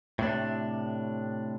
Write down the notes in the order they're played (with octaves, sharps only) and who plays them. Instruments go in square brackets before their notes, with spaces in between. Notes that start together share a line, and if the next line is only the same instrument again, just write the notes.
[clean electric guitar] A2 C3 D4